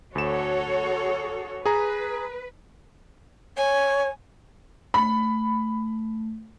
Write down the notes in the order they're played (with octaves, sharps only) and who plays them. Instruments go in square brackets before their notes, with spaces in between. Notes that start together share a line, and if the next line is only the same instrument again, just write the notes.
[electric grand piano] D2 E7 [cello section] F#4 A4 C#5
[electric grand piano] G#4 A#5 [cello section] B4
[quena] C#5 [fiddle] G#5
[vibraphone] A3 [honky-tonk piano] B5